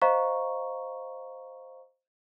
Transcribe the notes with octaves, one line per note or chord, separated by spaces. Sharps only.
C5 D#5 F5 A#5 C#6